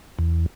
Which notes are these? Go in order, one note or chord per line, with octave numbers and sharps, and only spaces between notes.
E2